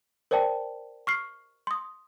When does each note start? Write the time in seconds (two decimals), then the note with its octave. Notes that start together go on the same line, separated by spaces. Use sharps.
0.31 A#4 C5 D5 G5 A5
1.07 C#6 F6 C7
1.67 C6 D#6